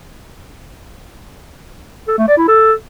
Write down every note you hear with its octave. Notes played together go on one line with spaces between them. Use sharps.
A4
A3
D5
E4
A4